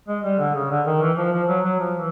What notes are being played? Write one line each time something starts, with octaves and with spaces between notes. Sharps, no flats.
G#3
G3
D3
C#3
D3
D#3
E3
F3
F3
F#3
F#3
F3
E3